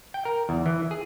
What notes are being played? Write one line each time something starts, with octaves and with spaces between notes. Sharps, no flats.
G5
A#4
E2
E3
G#4